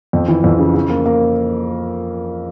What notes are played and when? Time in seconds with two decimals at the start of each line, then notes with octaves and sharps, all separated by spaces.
0.13 F2
0.28 E3
0.44 F2
0.59 C#3
0.74 C#3
0.90 A#3
1.06 A#3